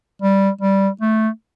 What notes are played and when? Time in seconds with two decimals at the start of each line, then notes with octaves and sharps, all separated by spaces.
0.22 G3
0.61 G3
1.01 A3